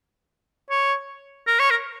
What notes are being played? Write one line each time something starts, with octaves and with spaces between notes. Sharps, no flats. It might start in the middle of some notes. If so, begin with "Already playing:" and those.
C#5
A#4
C#5
A#4